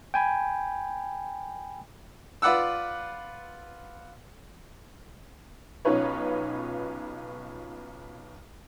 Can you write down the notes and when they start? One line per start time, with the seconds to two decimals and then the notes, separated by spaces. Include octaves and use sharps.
0.14 G5 G#5 B5
2.42 F4 B4 D5 F#5 E6
5.85 B1 C#4 D#4 F4 B4 C#5